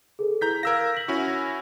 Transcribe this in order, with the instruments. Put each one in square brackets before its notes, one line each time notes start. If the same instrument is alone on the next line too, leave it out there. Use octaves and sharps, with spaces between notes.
[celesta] G#4 A4 B4
[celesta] E4 [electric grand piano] A#5 G6 B6
[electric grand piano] A#4 E6 A#6 [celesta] F5 G#6
[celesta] B6 F#7
[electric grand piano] C#4 E4 F#4
[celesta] A#6